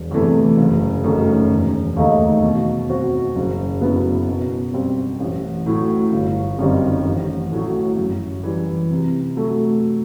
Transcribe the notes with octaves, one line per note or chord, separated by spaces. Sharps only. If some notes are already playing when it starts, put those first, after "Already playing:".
Already playing: E1
E2 C3 E3 A3
F#1
F#2 D#3 A3
E1
D#2 D#3 A3 D#4
B2
F#3 C4 F#4 C5
F#1
F#2 F#3 B3 E4
B2
G3 C4
A1
A2 F#3
G1
F#2 D#3 G3 C4
A1
A2 F#3
F#2
E3 G3
C3
F#3 A3